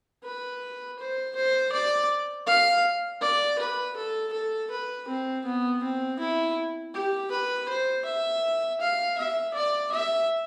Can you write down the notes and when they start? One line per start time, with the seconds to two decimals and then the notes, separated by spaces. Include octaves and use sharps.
0.24 B4
0.99 C5
1.36 C5
1.72 D5
2.47 F5
3.22 D5
3.59 B4
3.96 A4
4.33 A4
4.71 B4
5.08 C4
5.45 B3
5.83 C4
6.19 E4
6.94 G4
7.31 B4
7.69 C5
8.05 E5
8.81 F5
9.18 E5
9.54 D5
9.92 E5